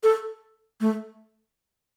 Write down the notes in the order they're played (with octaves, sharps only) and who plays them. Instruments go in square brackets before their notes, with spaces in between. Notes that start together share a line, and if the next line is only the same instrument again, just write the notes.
[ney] A4
A3